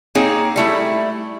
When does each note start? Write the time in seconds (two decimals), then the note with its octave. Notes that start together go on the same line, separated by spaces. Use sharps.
0.15 A#3 C4 D#4 G#4 C#5
0.56 G3 A3 E4